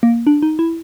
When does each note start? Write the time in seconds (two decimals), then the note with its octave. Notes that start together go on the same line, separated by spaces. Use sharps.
0.03 A#3
0.27 D4
0.43 D#4
0.59 E4